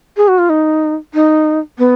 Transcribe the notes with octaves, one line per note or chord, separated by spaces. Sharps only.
G#4
F#4
F4
D#4
D#4
B3